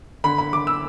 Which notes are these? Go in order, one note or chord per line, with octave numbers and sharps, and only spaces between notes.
D3 B5
B5
D3 D6
E6